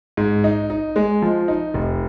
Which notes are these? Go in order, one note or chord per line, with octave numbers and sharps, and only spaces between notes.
G#2
D#4
D#4
G#3
F3
D#4
F1